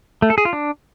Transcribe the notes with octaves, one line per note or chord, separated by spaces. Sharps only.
A3
A4
G#4
F4
D4